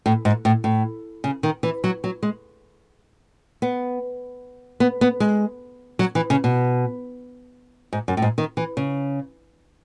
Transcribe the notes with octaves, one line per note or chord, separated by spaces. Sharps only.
A2
G#2
A2
A2
C#3
D#3
E3
F#3
F#3
G#3
B3
B3
B3
G#3
F#3
E3
C#3
B2
G#2
F#2
A2
G#2
D#3
E3
C#3